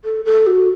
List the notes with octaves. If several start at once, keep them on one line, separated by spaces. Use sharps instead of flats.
A4
A4
F#4